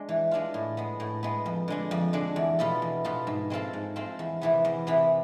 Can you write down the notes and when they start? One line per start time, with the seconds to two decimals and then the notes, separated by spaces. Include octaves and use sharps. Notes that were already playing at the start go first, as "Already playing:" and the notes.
Already playing: G#3 D4
0.09 E3
0.31 G#3 D4 F4
0.54 A2
0.77 G#3 B3
1.00 A2
1.23 G#3 B3
1.46 F2
1.68 D3 G#3 D4
1.91 F2
2.13 D3 G#3 D4
2.36 E2
2.59 B2 B3 F4 A4
2.82 E2
3.05 B2 B3 F4 A4
3.27 G#2
3.50 G#3 C4 F4 A4
3.73 G#2
3.96 G#3 C4 F4 A4
4.19 E2
4.41 C3 E3 B3
4.65 E2
4.87 C3 E3 B3